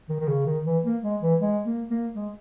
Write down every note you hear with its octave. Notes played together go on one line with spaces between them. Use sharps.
D#3
D#3
C#3
D#3
E3
A#3
G#3
E3
G#3
A#3
A#3
G#3